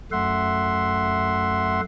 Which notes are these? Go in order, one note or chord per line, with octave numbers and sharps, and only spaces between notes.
F#2 A3 E5 F#5 C6